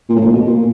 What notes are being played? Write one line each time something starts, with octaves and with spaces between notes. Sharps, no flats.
A#2
A2
A#2
B2
A#2
A#2